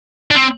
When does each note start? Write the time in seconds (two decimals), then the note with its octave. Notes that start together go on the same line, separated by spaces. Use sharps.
0.31 D4
0.35 C4